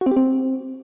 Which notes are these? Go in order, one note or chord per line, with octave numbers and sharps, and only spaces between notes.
F#4
C4
G4
C4